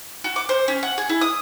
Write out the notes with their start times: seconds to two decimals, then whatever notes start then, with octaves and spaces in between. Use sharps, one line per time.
0.24 F#4
0.36 D6
0.49 C5
0.68 C#4
0.83 F#5
0.98 G#4
1.09 E4
1.21 D#6